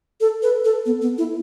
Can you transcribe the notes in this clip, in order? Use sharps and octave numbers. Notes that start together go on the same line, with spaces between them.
A4
B4
A4
B3
B3
E4